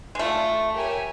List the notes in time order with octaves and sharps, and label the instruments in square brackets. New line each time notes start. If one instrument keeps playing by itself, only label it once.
[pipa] G#3
[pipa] A3 [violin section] F4 A4 D5
[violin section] G4 A#4 C#5 E5 G#5